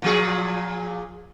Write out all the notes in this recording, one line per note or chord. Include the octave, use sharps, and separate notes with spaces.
A#2 F3 G#4